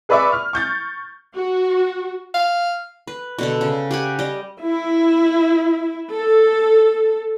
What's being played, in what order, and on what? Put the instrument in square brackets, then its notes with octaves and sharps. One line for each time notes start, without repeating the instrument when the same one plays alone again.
[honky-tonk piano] G#4 B4 D5 E5 C#6 D6
F6
C#6 G6 A6
[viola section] F#4
[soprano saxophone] F5
[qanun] B4
B2 D3 A4
C#3
G4 F#5 G#5
G3 D#5
[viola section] E4
A4